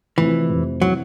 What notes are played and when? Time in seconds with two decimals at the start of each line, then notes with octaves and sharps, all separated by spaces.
0.18 F1 F2 C3 E3
0.49 F1 F2 C3
0.82 C3 E3 F#3